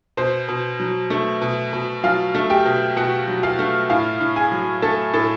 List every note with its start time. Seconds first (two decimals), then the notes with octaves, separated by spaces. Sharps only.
0.17 B2 C5
0.48 B2
0.80 F#3
1.10 A3
1.41 B2
1.73 B2
2.03 F#3 F4 F5
2.35 A3
2.50 G4 G5
2.65 B2
2.96 B2 F#4 F#5
3.28 F#3
3.43 F4 F5
3.59 A3
3.90 A2 F4 F5
4.21 A2
4.36 G#4 G#5
4.52 F#3
4.82 A3 A4 A5
5.13 A2 A4 A5